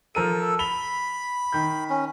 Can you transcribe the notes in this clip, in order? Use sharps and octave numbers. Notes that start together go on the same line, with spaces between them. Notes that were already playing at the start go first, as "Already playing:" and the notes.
F3 A4 A#4 D#7
B5 F7 G7
D#3 G6
C#4